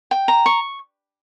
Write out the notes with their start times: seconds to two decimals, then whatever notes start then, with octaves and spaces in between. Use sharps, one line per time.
0.11 G5
0.28 A#5
0.46 C#6